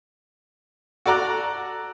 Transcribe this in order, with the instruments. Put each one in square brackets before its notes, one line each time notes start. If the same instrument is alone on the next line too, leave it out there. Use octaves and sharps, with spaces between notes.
[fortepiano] F#4 A4 D5 A#5 F#6